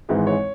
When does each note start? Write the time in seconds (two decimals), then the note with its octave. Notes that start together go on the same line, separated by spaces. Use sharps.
0.09 G#1 G#2 E3 G#3
0.27 C#5